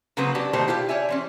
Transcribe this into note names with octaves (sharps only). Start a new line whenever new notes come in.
C#3 F#3 A#3 C4 B4
B3 D4 F#4 G4
B2 D#3 A3 A#3 G4 C5
E4 F4 G4
C#5 D5 E5 G#5
E3 C4 C#4